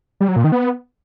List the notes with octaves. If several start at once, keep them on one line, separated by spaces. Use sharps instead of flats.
G3
F#3
A#2
D#3
B3